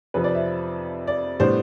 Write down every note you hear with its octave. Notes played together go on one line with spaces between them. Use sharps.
F2 C3 F3 C4 B4
D5
E5
D5
A2 G3 B3 D4 C5